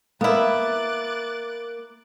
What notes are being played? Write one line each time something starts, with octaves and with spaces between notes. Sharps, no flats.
A#3 B3 E4 D6 F#6 A6